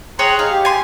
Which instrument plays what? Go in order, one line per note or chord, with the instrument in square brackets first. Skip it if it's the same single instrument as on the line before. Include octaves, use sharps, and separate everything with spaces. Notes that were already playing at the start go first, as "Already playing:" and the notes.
[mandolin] G#4 C#5 G5 [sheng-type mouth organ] A#5 C6 F#6
[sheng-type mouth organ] D#4 G#4 [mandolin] F5
[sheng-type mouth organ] G4
[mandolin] G#5 C6